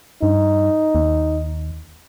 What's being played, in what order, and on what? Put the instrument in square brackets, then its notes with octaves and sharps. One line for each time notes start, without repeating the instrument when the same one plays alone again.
[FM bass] G2 [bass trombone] D#4
[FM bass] D#2